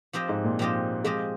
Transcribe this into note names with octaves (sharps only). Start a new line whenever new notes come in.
F3 C4 G4 C5 D#5
G#2
A#2
F3 C4 G4 C5 D#5
F3 G#3 C4 G4 C5 D#5